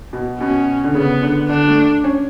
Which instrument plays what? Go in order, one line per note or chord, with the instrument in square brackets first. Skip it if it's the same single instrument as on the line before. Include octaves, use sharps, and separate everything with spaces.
[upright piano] B2
[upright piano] B2 [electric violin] C#4
[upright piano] D3
[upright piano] C#3 [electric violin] B3
[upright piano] D3
[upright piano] D3 [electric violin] D4
[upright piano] A3
C#4